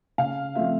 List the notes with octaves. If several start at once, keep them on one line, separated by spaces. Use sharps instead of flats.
C#3 F5
F3 A3 C4 E5